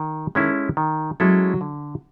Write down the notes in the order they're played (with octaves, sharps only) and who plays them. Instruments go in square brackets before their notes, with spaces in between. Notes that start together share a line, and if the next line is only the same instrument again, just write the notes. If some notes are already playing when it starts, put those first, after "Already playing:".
Already playing: [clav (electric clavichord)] D#3
[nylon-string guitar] D#3 [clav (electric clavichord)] G#3 C#4 E4 A4
[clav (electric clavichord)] D#3
[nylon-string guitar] F#3 [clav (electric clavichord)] G#3 C#4 E4 A4
[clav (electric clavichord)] D3